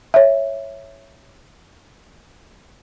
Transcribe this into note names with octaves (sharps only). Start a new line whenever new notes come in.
C#5 E5